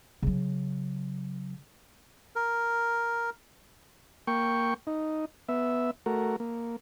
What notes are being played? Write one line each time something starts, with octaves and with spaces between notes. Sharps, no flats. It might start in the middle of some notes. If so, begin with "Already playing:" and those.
C#3 F#3
A#4
A#3 G5 C#6
D#4
B3 E5
A3 F#4 A#4
A#3